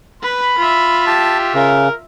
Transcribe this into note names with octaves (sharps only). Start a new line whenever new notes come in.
B4 B5
F4 E5
G4 A5
C#3 A#4